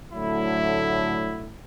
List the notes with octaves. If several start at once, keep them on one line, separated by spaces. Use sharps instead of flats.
A2 D3 F#3 A3 E4